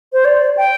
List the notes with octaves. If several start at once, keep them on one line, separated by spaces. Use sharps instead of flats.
C5
D5
G5